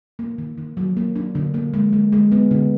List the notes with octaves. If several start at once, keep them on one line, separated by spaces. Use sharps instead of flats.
A#3
D#3
D#3
F#3
A#3
D4
D3
A#3
G#3
G#3
G#3
B3
D3